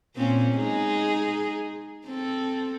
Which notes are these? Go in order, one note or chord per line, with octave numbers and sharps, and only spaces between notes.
A#2 C4 C#4
G#3 D#4 G#4
C4 A4